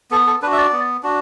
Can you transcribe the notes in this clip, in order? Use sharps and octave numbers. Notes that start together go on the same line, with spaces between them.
B3 A4
A4
D4 F#4 B4
E5
D5
B3
D4 F#4